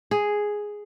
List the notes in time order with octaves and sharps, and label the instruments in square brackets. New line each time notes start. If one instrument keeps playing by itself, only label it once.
[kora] G#4